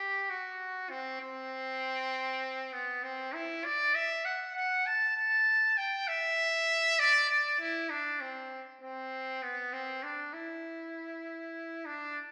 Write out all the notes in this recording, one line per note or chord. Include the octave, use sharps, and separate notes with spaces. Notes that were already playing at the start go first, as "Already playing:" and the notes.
Already playing: G4
F#4
C4
C4
B3
C4
E4
D5
E5
F#5
F#5
A5
A5
G5
E5
D5
D5
E4
D4
C4
C4
B3
C4
D4
E4
D4